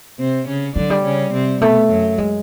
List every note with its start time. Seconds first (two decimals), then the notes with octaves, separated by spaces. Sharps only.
0.19 C3 C4
0.48 C#3 C#4
0.76 D3 F#3 D4
0.90 G3
1.04 C#3 C#4
1.33 C3 C4
1.61 B2 A3 B3
1.90 F#2 F#3
2.18 G#3